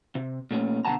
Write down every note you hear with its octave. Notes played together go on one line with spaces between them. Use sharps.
C3
A#2 A3 C#4
B2 D3 D#3 F#5 A5 A#5